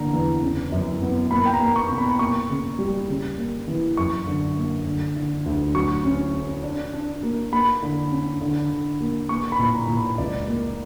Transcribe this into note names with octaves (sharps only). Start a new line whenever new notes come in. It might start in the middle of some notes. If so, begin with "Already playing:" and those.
Already playing: D3 A#3 A#5
E2
C#3
F#2
B3
A#3 B5
G5
A#5
A#3
C#6
B2
B5
A#3 C#6
C#3
G3
C#3
A#3
E3
F#2 C#6
D3
A#3
D3
D3
D2
F#3 C#6
C#4
C#4
D4
D4
A#3
A#3 B5
D3
C#4
D3
D3
A#3
A#3 C#6
B5
A#2
A#5
A#2
B5
C#2 D5
A#3